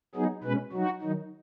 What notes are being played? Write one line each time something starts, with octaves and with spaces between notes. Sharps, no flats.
F#3 B3 D#4 G#4
B2 G#3 C#4 B4
F#3 D#4 F#4
D#3 F#3 D#4